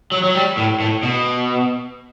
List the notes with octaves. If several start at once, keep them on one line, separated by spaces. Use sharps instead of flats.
F#3
F#3
G3
A2
A2
B2